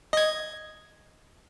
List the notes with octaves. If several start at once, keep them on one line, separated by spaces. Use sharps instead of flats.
D#5 G#6